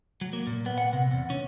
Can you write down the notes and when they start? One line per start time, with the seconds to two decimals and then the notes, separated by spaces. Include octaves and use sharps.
0.21 F#3
0.33 A#3
0.47 A#2
0.66 B3
0.78 F#5
0.93 C3
1.11 E2
1.30 C#4